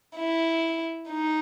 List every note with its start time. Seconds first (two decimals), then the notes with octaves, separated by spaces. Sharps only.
0.17 E4
1.10 D#4